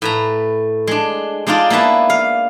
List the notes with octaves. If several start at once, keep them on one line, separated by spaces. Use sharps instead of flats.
A2 B4 A#5
G#3 D4
G#3 D4 D#4 F4 D5
A#3 B3 E4 B4 A5
F5